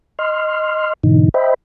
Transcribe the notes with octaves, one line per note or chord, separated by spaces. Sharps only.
D#5 C6 F6
G#2 B2 D3 E3 D#4
C5 D#5 E5 G5 B5